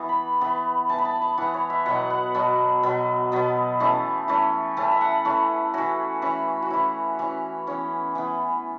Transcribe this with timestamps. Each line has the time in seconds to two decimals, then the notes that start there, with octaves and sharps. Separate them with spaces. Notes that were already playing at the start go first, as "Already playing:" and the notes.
Already playing: E3 B3
0.09 B5
0.41 E3 B3
0.89 E3 B3 A5
0.99 B5
1.05 A5
1.22 A5
1.38 E3 B3 F#5
1.54 C#5
1.70 E5
1.86 B2 F#3 B3 F#5
2.10 F#5
2.35 B2 F#3 B3 A5
2.83 B2 F#3 B3
3.32 B2 F#3 B3
3.80 E3 A3 C#4
4.28 E3 A3 C#4
4.77 E3 A3 C#4 A5
4.91 E5
5.01 F#5
5.25 E3 A3 C#4
5.73 E3 C#4 F#4
6.22 E3 C#4
6.62 F#4
6.70 E3 C#4 E4
7.19 E3 C#4
7.67 E3 B3 C#4
8.15 E3 B3